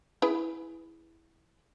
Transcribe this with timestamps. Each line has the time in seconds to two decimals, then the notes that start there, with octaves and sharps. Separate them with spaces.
0.22 E4 G#4 B4